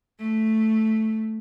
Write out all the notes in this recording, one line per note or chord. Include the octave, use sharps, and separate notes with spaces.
A3